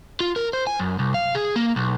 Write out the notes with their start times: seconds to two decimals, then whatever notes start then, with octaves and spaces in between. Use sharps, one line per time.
0.20 F4
0.36 A#4
0.53 C5
0.67 G#5
0.79 F#2
0.99 C2
1.14 F5
1.35 G#4
1.56 A#3
1.76 B1